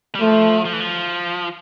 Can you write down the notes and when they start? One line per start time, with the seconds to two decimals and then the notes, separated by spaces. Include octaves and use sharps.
0.15 G3
0.20 F3 A3
0.65 F3
0.73 E3
0.80 F3